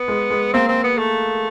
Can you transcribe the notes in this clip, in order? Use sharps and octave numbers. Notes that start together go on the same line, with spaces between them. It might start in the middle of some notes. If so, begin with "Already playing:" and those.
Already playing: B3
G#3
G#3
A#3 C4
C4
B3
A3